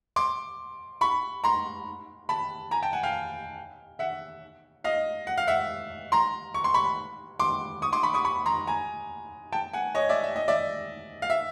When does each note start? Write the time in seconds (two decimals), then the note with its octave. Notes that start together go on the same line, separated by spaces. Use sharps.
0.16 C6 D6
1.01 B5 C#6
1.44 A#5 C6
2.29 A5 B5
2.71 G#5 A#5
2.82 G5 A5
2.93 F#5 G#5
3.03 F5 G5
3.99 E5 F#5
4.84 D#5 F5
5.27 F#5
5.38 F5
5.47 E5 F#5
6.12 A#5 C6
6.54 C#6
6.64 C6
6.74 B5 C#6
7.40 C6 D6
7.82 C#6 D#6
7.93 C6 D6
8.03 B5 C#6
8.14 C#6 D#6
8.25 B5 C#6
8.46 A#5 C6
8.67 G#5 A#5
9.52 G5 A5
9.73 F#5 G#5
9.95 C#5 D#5
10.09 D5 E5
10.23 E5
10.36 D#5
10.48 D5 E5
11.22 F5
11.30 E5